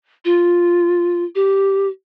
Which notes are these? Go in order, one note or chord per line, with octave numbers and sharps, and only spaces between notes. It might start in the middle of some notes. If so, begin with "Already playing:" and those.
F4
G4